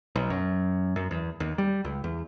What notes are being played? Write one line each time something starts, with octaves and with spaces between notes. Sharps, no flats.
B1
F#2
F#2
E2
D#2
G3
C#2
E2